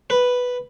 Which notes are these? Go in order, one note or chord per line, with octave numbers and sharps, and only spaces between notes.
B4